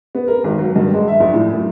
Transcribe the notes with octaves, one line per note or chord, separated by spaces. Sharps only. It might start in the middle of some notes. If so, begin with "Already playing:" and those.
B3
A#4
G#1
F#3
G2
G#3
E5
A#1
A2
F#2